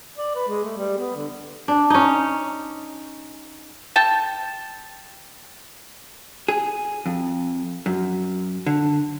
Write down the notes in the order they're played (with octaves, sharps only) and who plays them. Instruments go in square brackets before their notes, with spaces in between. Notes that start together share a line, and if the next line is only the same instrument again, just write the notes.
[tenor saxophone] D5
B4
G#3
A3
G3
B3
D3
[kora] D4
C#4 D#4
[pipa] A4 G5 A5
[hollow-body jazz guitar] G#4
F2
F#2
D3